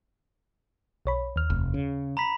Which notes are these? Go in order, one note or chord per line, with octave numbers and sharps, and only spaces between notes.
B1 C#5 B5
D#2 F6
F1
C#3
A#5 B5 B6